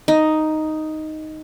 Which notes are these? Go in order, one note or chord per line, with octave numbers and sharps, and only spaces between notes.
D#4